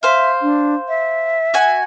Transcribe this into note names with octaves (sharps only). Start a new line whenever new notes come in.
C5 E5 F5
D4
E5
F#4 G#5